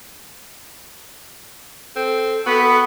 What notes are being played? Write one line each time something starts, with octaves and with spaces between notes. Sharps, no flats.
C4 A4
B3 F#4